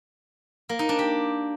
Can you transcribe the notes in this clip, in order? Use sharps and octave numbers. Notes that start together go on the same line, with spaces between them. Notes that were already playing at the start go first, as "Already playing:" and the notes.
A#3
D#4
D4
G4